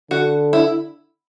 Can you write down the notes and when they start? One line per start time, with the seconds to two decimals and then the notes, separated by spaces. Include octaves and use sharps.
0.11 D3 F#4
0.53 E4